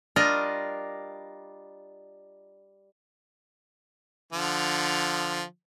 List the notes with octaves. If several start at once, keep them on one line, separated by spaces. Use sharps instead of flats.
G3 D4 F4 A#4 D#5
D3 F3